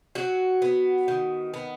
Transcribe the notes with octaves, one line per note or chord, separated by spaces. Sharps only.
F#3 F#4
B3
D#3
B3